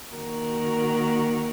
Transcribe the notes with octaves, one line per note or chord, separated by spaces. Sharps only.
D#3 A#3 F#4 A#4